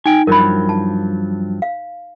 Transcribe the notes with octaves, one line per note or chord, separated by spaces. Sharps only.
D#4 G5 G#5
G2 F3 F#3 A#4 B5
A5
F5